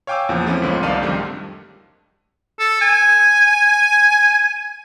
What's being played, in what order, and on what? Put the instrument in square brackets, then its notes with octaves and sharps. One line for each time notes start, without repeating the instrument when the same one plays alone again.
[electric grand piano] C#5 F5 G5 G#5 D6 E6
E2 A#2 C#3 F3
F3 A3 C4 C#4 E4
C#2 G#2 F3 A3 B3 C#4
C2 D#3 D5 F5 A5 D#7
F2 G#2 D3 D#3 G3 A3
[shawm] A4
G#5